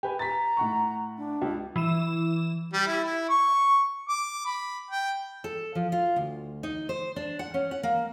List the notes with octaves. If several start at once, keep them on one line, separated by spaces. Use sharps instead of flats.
G4 B4 G#5
A#5 A6 B6
A2 F#5 C#6
D4
C#2
E3 E7
G3
E4
E4
C#6
D6
B5
G5
A4
F3
F4
D2
D#4
C5
D4
F#5
C#4
F#5
A#3